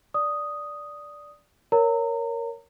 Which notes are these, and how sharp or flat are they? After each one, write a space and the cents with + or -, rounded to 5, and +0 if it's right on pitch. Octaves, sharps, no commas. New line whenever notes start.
D5 -5 D#6 +0
A#4 +0 C#5 +5 A#5 -30